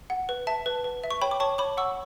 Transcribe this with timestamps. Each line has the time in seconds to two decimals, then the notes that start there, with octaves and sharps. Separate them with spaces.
0.10 F#5
0.29 B4
0.47 E5 A5
0.66 B4
0.84 B4
1.04 E5
1.11 C#6
1.22 C#5 G5 B5
1.31 D6
1.40 C#5 A5 C#6
1.58 C#5 B5 D6
1.77 F#5 C#6 E6